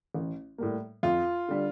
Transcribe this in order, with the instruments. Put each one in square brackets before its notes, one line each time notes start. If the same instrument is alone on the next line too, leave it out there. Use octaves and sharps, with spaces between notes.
[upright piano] A1
A2 G3 A#3
[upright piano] F2 [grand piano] F4
[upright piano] D3 G3